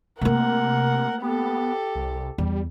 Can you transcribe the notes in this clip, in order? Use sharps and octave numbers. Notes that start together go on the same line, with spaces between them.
C3 A3 A#3 A#4 F#5
B3 G4 A4
C2
E2 G3